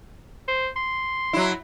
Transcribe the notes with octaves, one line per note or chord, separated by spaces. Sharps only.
C5
C6
F#3 E4